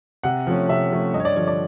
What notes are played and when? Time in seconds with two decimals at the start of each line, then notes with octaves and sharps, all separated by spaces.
0.23 C3 F#5
0.47 F3 A3 C#4
0.69 C3 E5
0.92 F3 A3 C#4
1.14 G2 D#5
1.20 C#5
1.25 D5
1.36 D3 F3 C#5
1.48 D5